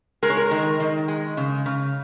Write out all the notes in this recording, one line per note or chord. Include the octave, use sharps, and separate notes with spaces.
G#3 A#4
C#5
A#4
D#3
D#3
G#3
C#3
C#3